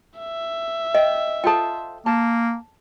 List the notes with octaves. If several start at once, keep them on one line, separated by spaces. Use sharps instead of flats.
E5
D#5 G5
F4 A4 C5 G5 A5
A#3 A5